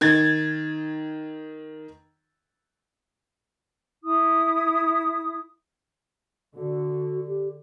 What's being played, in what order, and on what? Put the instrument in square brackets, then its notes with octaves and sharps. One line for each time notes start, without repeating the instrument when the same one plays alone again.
[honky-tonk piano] D#3 G#6 A6
[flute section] E4 D#6
[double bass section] D3 [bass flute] F#4
[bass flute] G4